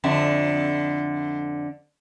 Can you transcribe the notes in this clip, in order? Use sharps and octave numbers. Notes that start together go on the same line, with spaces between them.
F2 D3 E5